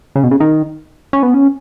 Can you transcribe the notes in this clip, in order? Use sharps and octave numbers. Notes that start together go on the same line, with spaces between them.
C#3
B2
C#3
D#3
C#4
B3
C#4